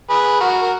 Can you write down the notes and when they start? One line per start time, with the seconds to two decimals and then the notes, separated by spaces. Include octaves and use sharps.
0.10 G#4 B4
0.40 F#4 A#4
0.62 A#4